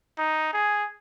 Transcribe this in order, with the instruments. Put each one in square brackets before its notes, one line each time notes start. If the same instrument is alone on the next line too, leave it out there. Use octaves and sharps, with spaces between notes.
[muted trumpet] D#4
G#4